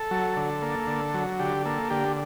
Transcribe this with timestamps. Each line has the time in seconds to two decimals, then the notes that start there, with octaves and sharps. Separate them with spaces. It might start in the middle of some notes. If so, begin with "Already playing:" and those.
Already playing: A4
0.11 F#3
0.36 D3
0.62 A#3
0.87 D3
1.14 F#3
1.39 D3 G4
1.65 A#3 A4
1.90 D3 G4